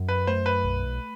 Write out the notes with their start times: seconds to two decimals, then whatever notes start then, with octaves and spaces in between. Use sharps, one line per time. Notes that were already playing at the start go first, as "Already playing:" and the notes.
Already playing: F#2
0.09 B4
0.27 A3 C5
0.46 B4
0.64 B1